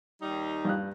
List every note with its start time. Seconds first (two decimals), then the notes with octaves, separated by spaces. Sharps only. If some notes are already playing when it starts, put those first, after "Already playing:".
0.22 D#2 G3 D#4
0.65 G2 F5 F#6